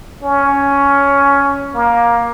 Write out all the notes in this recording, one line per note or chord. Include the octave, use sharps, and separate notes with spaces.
C#4
A#3